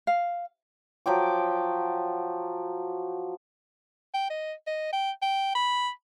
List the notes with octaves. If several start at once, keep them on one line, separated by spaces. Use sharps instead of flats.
F5
F3 F#3 G5 D6
G5
D#5
D#5
G5
G5
B5